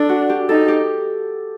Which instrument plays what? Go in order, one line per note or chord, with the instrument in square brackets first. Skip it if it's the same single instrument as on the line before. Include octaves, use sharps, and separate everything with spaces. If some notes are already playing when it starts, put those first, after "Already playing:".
Already playing: [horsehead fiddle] D4 [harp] A4
[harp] F#4
G4
[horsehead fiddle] D#4 [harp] A4
[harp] G4